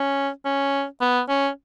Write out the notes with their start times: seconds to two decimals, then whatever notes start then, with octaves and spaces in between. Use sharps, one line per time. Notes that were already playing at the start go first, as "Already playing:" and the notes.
Already playing: C#4
0.45 C#4
1.01 B3
1.29 C#4